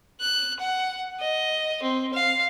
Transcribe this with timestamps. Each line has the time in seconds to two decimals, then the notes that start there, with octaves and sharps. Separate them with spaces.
0.21 F#6
0.59 F#5
1.20 D#5
1.82 C4
2.14 F5